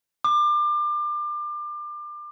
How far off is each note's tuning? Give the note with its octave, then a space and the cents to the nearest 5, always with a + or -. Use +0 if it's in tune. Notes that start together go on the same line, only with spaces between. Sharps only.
D6 +30